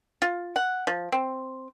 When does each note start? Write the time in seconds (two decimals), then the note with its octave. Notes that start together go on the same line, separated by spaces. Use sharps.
0.22 F4
0.56 F#5
0.87 F3
1.12 C4